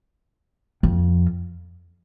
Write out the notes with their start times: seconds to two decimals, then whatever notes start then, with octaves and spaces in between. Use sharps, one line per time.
0.83 F2